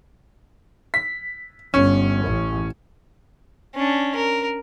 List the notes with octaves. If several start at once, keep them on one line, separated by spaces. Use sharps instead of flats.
B6
G1 C#4
A1
C#4 D4
A#4